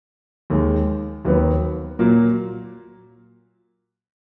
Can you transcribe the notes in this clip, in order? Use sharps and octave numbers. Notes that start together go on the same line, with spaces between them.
D#2 D#3 G#3
D#2 D#3 F#3 B3
A#2 F#3 A#3